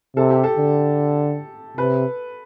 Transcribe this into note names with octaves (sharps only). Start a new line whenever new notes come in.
C3 A4
G4
A4
D3
C3 B4